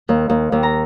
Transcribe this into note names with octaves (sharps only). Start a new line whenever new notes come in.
D#2
D#2
D#2
A#5